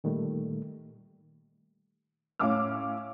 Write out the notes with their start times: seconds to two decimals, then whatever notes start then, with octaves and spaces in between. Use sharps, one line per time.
0.04 A#2 D#3 G3 A3
2.39 A2 C#4 F5 D6 E6 F6